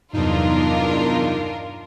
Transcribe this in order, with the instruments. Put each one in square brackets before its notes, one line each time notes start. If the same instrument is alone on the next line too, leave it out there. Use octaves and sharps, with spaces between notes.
[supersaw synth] E2 D#4 [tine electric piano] G2 C3 F#3 [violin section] D4 F4 A#4